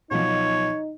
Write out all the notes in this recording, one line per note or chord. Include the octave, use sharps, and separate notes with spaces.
B2 F3 F#3 D#4 C#5